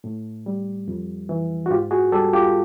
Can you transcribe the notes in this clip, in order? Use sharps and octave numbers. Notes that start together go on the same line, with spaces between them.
A2
G3
F2
E3
F#4
G#2 F4 G4
F#4 G#4
G3 G4 A4
F4 G4